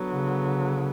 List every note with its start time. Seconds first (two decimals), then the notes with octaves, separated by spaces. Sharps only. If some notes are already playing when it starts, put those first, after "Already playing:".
Already playing: D3 F#3 B3
0.12 C#3